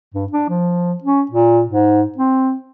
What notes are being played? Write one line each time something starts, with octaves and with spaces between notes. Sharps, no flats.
G2
D4
F3
C#4
A#2
G#2
C4